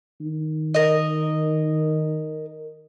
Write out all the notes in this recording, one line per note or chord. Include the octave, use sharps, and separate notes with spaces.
D#3
A#4 D#5